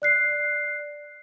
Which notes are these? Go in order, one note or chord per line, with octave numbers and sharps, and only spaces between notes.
D5 F#6 C7